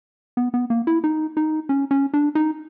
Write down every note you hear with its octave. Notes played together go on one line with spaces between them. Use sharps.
B3
B3
A#3
E4
D#4
D#4
C#4
C#4
D4
D#4